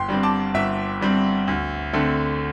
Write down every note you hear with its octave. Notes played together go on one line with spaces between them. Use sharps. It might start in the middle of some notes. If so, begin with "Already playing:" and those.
Already playing: G1 G5 C6
G2 G3 C4
A5 D6
G1 E5
G2 G3 C4
D2
D3 A3 C4